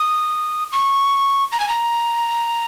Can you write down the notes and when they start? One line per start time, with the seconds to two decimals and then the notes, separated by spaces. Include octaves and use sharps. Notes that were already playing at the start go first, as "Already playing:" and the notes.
Already playing: D#6
0.72 C#6
1.52 A#5
1.60 G#5
1.69 A#5